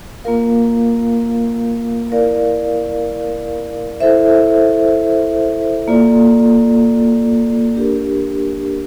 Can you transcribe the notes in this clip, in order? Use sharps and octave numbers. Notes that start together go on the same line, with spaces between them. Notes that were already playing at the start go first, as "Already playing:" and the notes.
A#3 F4 A#4 F5
E4 A#4 D5 F5
E4 A4 C5 E5
A#3 F4 A4 D5
D4 G4 A#4